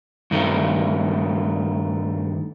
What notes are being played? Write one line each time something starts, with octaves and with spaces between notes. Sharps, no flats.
G2 D#3 A3